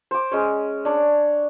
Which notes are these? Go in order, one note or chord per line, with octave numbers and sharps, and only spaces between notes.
C5 D6
G#3 C#4 C#5
D4 C#5